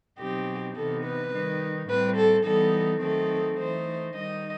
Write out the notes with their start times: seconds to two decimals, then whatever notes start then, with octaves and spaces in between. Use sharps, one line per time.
0.20 B2 F#3 C4 D#4 G4
0.76 C3 E3 B3 D#4 A4
1.05 B4
1.33 D#3 G3 D#4
1.89 A2 G3 C4 B4
2.17 A4
2.45 E3 G3 B3 D#4 A4
3.01 D#3 F#3 A3 C4 D#4 A4
3.58 E3 A3 D#4 C5
4.15 D#3 G3 D#4 D#5